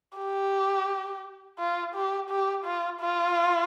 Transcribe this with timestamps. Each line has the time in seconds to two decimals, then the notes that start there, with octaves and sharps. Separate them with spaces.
0.18 G4
1.59 F4
1.95 G4
2.30 G4
2.65 F4
3.01 F4